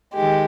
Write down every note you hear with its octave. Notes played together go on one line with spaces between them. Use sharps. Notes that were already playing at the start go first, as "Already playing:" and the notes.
D#3 G#3 G4